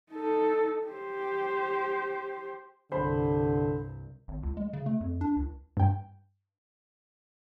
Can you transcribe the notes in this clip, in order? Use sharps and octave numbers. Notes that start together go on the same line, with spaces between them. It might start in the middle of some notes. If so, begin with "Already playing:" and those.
D#4 A4
G4 C5
C2 G2 D3 C5 B5
G#1
C#2
G#3
C#3
A3
F2
D4
C#2
G2 G5